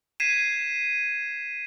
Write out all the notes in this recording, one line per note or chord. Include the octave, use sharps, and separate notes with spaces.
G#6 B6 C7 D#7 E7